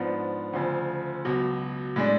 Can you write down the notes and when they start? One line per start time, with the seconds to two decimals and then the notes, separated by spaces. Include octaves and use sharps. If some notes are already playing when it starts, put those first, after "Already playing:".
Already playing: G#2 F3 B3 D4
0.53 D2 C#3 F3
1.25 C#2 B2 F#3
1.96 A2 G#3 D4